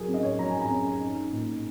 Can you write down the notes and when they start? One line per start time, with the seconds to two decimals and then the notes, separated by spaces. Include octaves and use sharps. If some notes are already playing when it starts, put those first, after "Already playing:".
Already playing: F#3 G#4 A#4
0.08 C#4
0.14 D#5
0.23 C#5
0.39 F#3 A#5
0.50 G#5
0.61 A#5
0.70 C#4
1.01 D#4
1.32 A#2